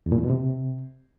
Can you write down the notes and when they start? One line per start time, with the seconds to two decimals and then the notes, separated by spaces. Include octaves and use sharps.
0.06 E2
0.12 A#2
0.18 E2
0.24 B2
0.30 C3